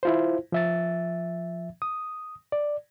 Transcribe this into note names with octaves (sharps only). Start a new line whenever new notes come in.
E4 F4 C5
F3 E5 A6
D#6
D5